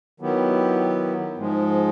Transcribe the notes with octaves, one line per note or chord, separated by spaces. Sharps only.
D#3 F#3 B3 E4 G4
G#2 F3 G#3